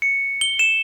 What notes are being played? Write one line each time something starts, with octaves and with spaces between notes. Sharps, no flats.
C#7
G7
E7